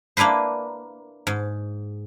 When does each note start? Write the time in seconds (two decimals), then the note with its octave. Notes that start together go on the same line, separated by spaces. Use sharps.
0.17 A#3 D4 E4 B4 C5
1.27 G#2